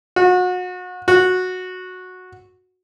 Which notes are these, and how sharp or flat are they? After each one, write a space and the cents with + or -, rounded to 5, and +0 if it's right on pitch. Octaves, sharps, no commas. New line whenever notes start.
F#4 -30
F#4 -10